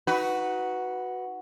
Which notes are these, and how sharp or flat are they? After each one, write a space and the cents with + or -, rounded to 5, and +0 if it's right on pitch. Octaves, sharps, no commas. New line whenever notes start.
D#4 +30 F#4 +0 B4 +0